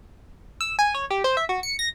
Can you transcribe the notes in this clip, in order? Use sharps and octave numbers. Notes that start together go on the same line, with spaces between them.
E6
G#5
C#5
G4
C5
E5
F#4
C#7
A#6